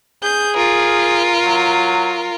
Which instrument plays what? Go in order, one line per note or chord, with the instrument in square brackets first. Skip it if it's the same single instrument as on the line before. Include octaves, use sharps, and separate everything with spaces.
[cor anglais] G#4 [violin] G6
[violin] F4 A#4
[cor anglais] F#3